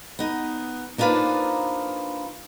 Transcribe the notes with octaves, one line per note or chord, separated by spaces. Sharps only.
B3 D#4
A#3 D4 D#4 F4 B4 C5